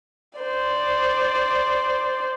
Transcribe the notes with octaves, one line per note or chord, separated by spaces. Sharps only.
C5 D5